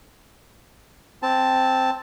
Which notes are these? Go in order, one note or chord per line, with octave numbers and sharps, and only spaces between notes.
C4 A5